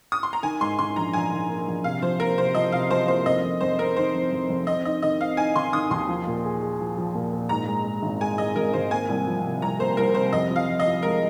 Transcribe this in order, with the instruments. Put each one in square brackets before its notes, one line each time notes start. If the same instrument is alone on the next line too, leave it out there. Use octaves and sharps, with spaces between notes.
[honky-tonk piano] D#6
C6
A#5
[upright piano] D#3 [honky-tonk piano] G#5
[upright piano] G#2 [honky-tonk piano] C6
[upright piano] D#3 [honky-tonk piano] C6
[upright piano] A#1 [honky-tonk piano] A#5
[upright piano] A#1 [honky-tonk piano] G#5
[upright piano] D#3
A#3
A#1
[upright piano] C3 [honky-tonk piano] F5
[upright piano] F3 [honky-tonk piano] C5
[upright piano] A#3 [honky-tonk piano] A#4
[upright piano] C3 [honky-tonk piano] C5
[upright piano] F3 [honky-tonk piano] D#5
[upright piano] C3 [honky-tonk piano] F5
[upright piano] F3 [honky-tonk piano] C5
[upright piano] A#3 [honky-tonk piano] C5
[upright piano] F1 [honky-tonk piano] D#5
[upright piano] F1
[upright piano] F1 [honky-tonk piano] C5
[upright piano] C4 [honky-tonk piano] A#4
[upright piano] D#3 [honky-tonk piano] C5
[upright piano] F1
F1
F1
[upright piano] C4 [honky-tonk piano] D#5
[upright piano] D#4 [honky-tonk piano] D#5
[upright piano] D#3 [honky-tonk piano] D#5
[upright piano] C4 [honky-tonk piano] F5
[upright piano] D#4 [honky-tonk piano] G#5
[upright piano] D#3 [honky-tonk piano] C6
[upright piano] D#3 [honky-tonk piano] D#6
[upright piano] D#2 [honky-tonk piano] C6
[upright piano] F3
A#2
G#4
G#4
F3
F3
A#2
A#2
[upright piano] G#2 [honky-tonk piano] A#5
[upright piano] G#3
G#3
G#1
[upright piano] G#3 [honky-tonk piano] G#5
[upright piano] G#3 [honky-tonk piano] D#5
[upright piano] G#1 [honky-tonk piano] A#4
[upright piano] G#1 [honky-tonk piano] C5
[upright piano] A#3 [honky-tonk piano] G#5
[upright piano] C2
F3
C3
[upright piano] C2 [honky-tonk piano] A#5
[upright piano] A#3 [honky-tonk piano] C5
[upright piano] C2 [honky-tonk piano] A#4
[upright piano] C3 [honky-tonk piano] C5
[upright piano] F2 [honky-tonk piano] D#5
[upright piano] F3
[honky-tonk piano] F5
[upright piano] F3
[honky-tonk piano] D#5
[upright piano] F3
[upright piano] G#3 [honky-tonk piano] A#4